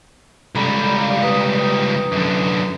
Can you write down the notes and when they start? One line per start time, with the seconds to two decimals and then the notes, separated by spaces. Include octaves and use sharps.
0.55 C#2 G3 A4 A#5 B5
0.99 F5
1.23 B4 A#5 D#6
2.12 F#2 D3